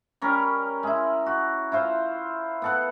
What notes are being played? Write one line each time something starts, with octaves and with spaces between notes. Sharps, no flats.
G3 C#4 A#4
G#3 E4
F#4
E4 F4 C5
B3 A4 F#5